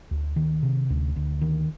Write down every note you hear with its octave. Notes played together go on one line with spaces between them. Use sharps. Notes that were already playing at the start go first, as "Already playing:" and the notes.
D2
D#3
C3
D2
D2
D#3